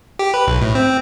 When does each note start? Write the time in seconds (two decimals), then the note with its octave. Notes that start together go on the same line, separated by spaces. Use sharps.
0.19 G4
0.34 B4
0.47 B1
0.61 A2
0.75 C4